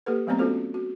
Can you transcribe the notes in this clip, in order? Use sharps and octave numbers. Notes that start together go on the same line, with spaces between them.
A#3 G4 A4 B4
F#3 A3 B3 C4 D5 A#5
B3 C#4 F4 F#4 A4 C5
F#4